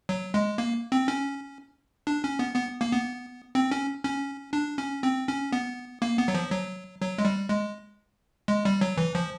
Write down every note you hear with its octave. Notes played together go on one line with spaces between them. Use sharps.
F#3
G#3
A#3
C4
C#4
D4
C#4
B3
B3
A#3
B3
C4
C#4
C#4
D4
C#4
C4
C#4
B3
A#3
B3
F#3
F3
F#3
F#3
G#3
G3
G#3
G#3
G3
F#3
E3
F3